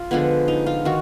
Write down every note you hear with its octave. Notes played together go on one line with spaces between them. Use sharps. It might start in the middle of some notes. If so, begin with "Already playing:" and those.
Already playing: F4
D3 F3 G#3 B3
D#4
F4
D#3 F#4